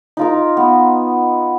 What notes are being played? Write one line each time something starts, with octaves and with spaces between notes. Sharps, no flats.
D#4 F4 A#4
B3